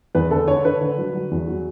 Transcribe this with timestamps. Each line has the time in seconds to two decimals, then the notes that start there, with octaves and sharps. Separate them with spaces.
0.15 E2 B4
0.31 D3 A4
0.48 D3 C#5
0.65 D3 B4
0.81 D3
0.98 F#3
1.14 F#3
1.31 E2
1.48 F#3